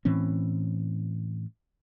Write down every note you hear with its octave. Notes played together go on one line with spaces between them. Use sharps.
A2 E3 C4 C#4